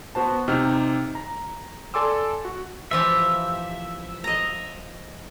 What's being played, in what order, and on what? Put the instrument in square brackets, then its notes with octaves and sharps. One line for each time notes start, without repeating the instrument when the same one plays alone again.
[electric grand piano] B3 F#4 C5 A5
C3 D#4 G4 F6
A#5
A4 D5 G#5 C6 D6 E6
F#4
[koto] E3 F3 G4 [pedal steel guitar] E5
[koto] D#5 A#5